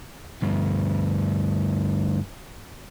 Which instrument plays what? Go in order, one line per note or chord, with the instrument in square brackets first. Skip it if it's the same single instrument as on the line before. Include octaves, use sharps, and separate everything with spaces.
[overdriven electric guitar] D2 G2